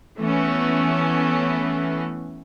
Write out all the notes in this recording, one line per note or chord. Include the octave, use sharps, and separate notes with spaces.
E3 A3 B3 C#4